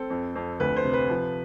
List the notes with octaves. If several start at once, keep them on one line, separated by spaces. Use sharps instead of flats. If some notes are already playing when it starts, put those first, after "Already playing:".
Already playing: C4 A4
F2
F2
D2 B4
C5
C3
B4
F3